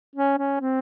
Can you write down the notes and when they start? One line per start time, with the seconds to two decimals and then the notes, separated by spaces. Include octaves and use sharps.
0.16 C#4
0.38 C#4
0.61 C4